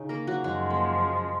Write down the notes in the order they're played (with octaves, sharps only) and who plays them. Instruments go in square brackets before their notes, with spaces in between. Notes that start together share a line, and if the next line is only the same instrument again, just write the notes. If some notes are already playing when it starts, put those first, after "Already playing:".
Already playing: [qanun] C#3 C#4 D#4
A#3 A#4
F#3 F#4
[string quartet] F#2 F3 G#3 [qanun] F#3 F#4
[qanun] A#3